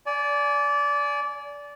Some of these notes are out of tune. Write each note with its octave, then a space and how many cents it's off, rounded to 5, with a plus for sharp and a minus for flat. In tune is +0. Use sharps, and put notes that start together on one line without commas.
D5 -20 G#5 +20